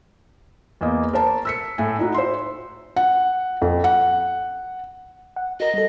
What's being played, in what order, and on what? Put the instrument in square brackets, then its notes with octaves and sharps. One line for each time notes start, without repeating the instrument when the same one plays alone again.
[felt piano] E2 A#3 D#5
A#4 C5 A5
E6 B6 C#7
A2 G#5
D#4 E4 F#4
C5 C6
F#5
F2
F#5
[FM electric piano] F#5
[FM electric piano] F#4 A#4 [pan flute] D#5
[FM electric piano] G3 A4